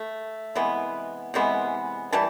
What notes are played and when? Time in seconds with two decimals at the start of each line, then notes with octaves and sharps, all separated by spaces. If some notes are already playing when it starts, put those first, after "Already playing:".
Already playing: A3
0.55 C3 E3 G#3 B3
1.34 C3 E3 G#3 B3
2.12 E3 G3 A5